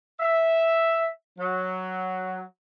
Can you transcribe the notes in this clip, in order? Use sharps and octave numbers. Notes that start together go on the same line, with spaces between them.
E5
F#3